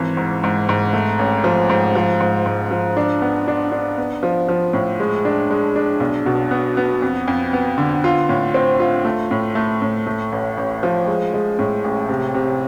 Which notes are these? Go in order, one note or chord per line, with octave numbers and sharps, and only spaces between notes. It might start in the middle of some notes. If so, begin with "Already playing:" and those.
Already playing: G#1 E3
G#2
G#2
G#2
A3
A1
F3
G#2
F3
G#2
G#2
F3
D4
B3
D4
D4
B3
F3
F3
A2
G#3
D4
G#3
D4
B1
B2
B3
B3
F2
F2
B3
D3
F4
A2
C4
F4
A3
A2
A3
A2
A3
A1
A1
F3
G#3
G#3
A2
A1
C3
C3